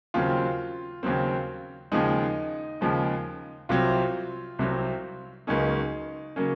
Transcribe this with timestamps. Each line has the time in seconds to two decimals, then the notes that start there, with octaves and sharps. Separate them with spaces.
0.14 D#2 C#3 F#3 C4 F4
1.03 D#2 C#3 F#3 C4
1.92 D#2 C#3 F3 G#3 D#4
2.81 D#2 C#3 F3 G#3
3.69 C2 C3 F#3 C4 F4
4.59 C2 C3 F#3 C4
5.47 C#2 C#3 F#3 A#3 C#4 D#4
6.36 C#3 F#3 A#3 C#4